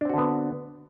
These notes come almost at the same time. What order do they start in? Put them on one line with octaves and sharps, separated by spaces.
D4 C4 F#4 D3 B3